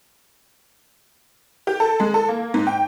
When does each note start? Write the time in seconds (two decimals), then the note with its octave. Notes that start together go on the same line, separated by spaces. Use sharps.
1.67 G4
1.80 A4
2.00 G#3
2.14 A4
2.28 A#3
2.54 G#2
2.67 G5